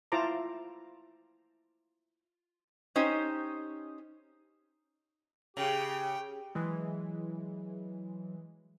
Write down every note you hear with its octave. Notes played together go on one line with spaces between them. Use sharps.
E4 F4 C5 A5 A#5 D6
C#4 D#4 G4 C5
C#3 G4 G5
E3 F#3 G#3